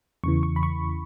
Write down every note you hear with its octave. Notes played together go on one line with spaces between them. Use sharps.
E2 C#3 E3 C#6
C#6
B5
C#6